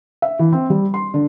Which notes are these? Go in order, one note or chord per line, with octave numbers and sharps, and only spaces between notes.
E5
E3
C4
G3
C6
D3